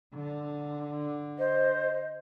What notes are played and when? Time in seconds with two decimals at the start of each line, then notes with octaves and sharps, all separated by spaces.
0.15 D3
1.38 C5 D#5